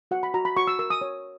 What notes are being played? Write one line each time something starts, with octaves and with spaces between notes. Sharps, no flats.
F#4 F#5
B5
F#4 A#5
B5
F#4 C#6
E6
A#4 E6
D#6
C#5